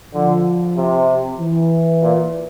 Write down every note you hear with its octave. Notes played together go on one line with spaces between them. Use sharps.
D3 F3
C3
E3
A#2